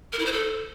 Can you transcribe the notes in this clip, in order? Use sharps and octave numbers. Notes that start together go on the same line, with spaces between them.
A#4
E4
C5
A4